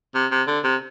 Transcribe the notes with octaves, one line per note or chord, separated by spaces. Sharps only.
C3
C3
D3
C3